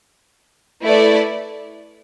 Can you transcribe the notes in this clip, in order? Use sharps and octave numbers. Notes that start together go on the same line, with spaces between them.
A3 E4 B4 D5